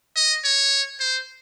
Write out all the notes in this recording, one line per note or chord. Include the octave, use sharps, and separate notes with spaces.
D#5
C#5
C5